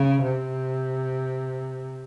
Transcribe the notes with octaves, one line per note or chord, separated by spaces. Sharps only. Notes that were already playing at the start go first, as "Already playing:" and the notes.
Already playing: C#3
C3